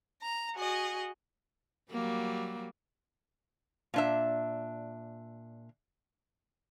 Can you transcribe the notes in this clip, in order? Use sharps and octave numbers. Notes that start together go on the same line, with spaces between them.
A#5
F#4 G#4 D#5
F#3 G3 A#3
A#2 D4 E5